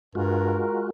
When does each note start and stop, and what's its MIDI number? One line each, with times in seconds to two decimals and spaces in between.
0.15 0.63 43
0.15 0.90 56
0.15 0.90 65
0.15 0.90 66
0.15 0.86 70